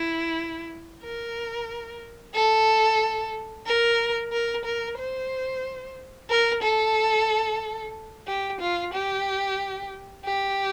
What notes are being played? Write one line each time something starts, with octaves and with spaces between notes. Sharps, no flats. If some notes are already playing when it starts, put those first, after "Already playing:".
Already playing: E4
A#4
A4
A#4
A#4
A#4
C5
A#4
A4
G4
F4
G4
G4